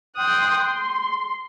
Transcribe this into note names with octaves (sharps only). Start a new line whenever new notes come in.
G5 C6 D#6 F#6
C6